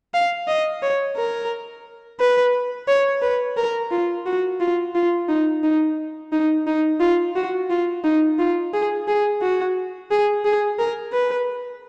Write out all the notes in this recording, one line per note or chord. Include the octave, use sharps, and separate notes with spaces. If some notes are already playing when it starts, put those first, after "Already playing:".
F5
D#5
C#5
A#4
B4
C#5
B4
A#4
F4
F#4
F4
F4
D#4
D#4
D#4
D#4
F4
F#4
F4
D#4
F4
G#4
G#4
F#4
G#4
G#4
A#4
B4